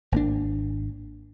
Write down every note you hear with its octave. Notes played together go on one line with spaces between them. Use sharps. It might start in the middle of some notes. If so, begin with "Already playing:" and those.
G#1 A#3 D4